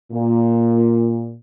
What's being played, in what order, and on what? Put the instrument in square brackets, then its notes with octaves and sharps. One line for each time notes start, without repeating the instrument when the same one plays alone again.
[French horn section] A#2